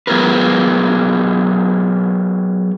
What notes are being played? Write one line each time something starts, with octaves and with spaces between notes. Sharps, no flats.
F#3 B3 F4 G#4 A#4 B4